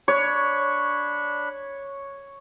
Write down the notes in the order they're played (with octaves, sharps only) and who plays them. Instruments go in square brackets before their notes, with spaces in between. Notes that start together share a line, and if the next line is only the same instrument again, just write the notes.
[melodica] D4 B5 [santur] C#5